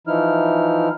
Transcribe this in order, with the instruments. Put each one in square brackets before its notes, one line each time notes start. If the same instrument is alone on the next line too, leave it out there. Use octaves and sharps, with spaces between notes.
[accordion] E3 F3 D#4 E4 F6